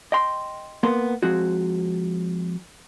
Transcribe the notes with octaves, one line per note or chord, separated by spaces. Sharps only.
D#5 G5 C6
A#3 B3 A#4 C6
F3 G#3 C4 F#4